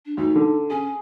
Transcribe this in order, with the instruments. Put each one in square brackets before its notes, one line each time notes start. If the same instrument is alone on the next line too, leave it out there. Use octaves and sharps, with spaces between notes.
[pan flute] D4
[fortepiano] D2 [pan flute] D#4
[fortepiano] D3
[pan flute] C#4 [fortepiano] G#4